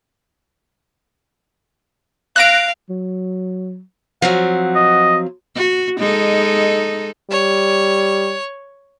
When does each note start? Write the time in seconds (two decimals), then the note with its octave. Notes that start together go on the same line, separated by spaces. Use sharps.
2.36 F5 F#6 A#6 D7
2.89 F#3
4.22 F3 F#3 C4 F#5
4.76 D#5
5.56 F#4
5.98 G#3 D#4 A4
7.30 G3 C#5